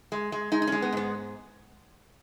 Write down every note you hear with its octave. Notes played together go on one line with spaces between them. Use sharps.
G#3
G#3
G#3 D#4
D#4
G#3 C#4
B3
G#2 B3